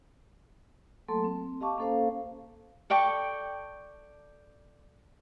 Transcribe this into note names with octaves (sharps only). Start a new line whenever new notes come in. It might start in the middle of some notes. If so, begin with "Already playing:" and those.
F#3 A3 A#3 A4 A5 C6
C4
G4 D#5 F5 A5 C#6 D6
A#3 C#4 A4 C5 F5
A4 D5 G5 C#6